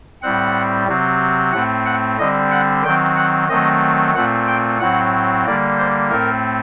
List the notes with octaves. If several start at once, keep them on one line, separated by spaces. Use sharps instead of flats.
A2 G3 C4 F#5
C3 F#3 C4
A2 A3 C4 F#5
F#5
D3 G3 C4 D#5
F#5
D#3 F#3 C4 G5
F#5
D#3 F#3 A3 C4 D#5
A#2 A3 C4 F#5
G5
A2 F#3 C4 F#5
D3 G3 A#3 D5
C5
A2 A3 C4 A#4